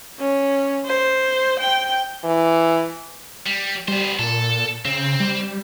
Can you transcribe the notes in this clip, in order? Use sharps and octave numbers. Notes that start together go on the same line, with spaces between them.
C#4
C5
G5
E3
G3
G3 B3 C5
A#2 A4
C#3 C4
G3